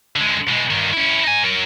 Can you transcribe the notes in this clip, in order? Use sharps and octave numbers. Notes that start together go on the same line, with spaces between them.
D3 G#3
B2 G#3
G2 D#3
C#4 E4
D#4 G#5
F#3 A#4